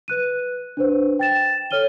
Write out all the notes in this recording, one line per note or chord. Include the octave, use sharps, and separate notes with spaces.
B4 F#6 D#7
D4 B4 C5
G5 A6 E7
A4 C#5 F6 D#7 G7